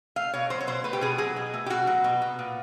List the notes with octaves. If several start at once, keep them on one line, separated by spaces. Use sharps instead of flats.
A3 F5
B2 C#5
F#3 C5
C#5
B2 C5
A3 B4
G4
B2 G#4
F#3 G#4
B2
A3
G4
B2 F#4
F#3
B2
B3
A#2